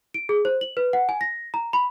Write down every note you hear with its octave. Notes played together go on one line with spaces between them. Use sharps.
D7
G#4
C5
F#7
B4
F#5
G#5
A#6
A#5
B5